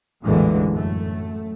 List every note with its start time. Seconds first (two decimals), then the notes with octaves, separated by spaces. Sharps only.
0.22 A1 E2 A#2 D3 E3 G#3
0.72 F#2 A3